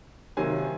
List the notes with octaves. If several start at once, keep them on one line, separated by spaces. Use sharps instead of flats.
C3 D#3 F#3 A#3 G#5